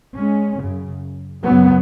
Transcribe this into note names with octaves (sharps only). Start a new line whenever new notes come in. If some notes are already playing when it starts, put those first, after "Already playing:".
G#3 C#4
F#2 C#3
F#2 C#3 F#3 B3